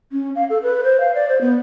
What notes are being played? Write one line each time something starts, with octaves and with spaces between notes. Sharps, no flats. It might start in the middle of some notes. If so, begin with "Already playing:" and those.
C#4
F5
A4
B4
C5
F5
D5
C5
B3